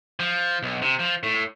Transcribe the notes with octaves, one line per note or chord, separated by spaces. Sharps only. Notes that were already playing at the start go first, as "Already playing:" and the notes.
F3
B1
C3
F3
A2